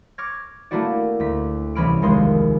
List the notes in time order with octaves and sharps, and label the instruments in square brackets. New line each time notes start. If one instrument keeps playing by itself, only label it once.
[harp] C#6 D6 F6 G#6 A#6
A3 A#3 D4 E4 F#4 D5
D2 B6
C2 E3 C#4 B5 F6 D7
F1 D#2 D#3 G#3 C6